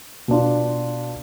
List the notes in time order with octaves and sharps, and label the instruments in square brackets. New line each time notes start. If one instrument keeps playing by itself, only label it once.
[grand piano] B2 B3 D4 F4